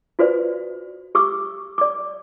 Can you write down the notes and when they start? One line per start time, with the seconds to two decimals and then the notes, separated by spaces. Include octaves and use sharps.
0.19 F4 F#4 B4 C5 D5
1.15 G4 C#6 D6 E6
1.78 D5 D6